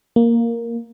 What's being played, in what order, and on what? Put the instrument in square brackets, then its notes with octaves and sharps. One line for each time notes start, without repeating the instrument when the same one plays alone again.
[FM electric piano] A#3